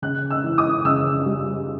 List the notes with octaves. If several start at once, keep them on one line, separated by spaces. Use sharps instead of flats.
C#3 F#6
E6
E3
D#6
C#3 E6
G3